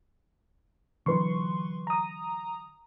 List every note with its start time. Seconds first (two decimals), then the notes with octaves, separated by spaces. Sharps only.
1.06 D3 E3 F#3 B4 C6 C#6
1.87 A#5 D#6